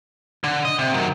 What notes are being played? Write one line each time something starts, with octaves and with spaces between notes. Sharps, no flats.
D3
D#5
C3
D#3 F#3